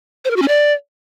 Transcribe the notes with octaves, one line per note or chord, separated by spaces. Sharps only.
C5
A#4
F#4
C#4
D5